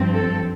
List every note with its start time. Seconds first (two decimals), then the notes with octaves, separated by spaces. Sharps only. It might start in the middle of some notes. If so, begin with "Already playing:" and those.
Already playing: G2 F3 C4
0.14 A4